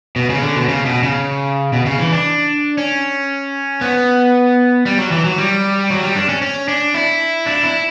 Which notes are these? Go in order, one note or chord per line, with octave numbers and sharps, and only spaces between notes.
B2
C#3
D3
B2
C#3
B2
C#3
B2
C#3
E3
D4
C#4
B3
G3
F#3
E3
F#3
G3
F#3
G3
D4
C#4
C#4
D4
E4
D4
E4